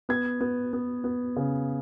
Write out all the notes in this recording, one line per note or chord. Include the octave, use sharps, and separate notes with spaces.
B3 G#6
B3
B3
B3
C#3